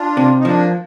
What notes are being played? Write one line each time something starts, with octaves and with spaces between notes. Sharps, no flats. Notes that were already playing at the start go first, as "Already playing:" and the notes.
Already playing: D4 F4
C3
D#4
F3 A#3 D4